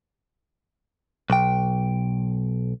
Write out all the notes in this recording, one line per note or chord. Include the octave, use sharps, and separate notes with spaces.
B1 G5